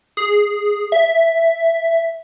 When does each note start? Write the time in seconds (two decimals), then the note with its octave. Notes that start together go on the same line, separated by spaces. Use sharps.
0.17 G#4
0.92 E5